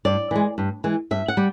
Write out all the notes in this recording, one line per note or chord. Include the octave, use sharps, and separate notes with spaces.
G2 D5
E3 G#3
G2
E3 G#3
G2 E5
F#5
G3